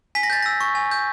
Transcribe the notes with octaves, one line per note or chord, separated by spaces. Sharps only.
G#5 B6
A#6
G6 A6
E6 A#6
C#6
G#5
G6